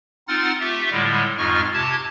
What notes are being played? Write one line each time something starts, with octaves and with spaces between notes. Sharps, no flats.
C4 D#4 F4 F#5 F6 A6
A3 F4 G4 E5
A2 D3 G3 G#3
F2 G#2 G#3 F4 C#6 F6
C3 G4 A5 G#6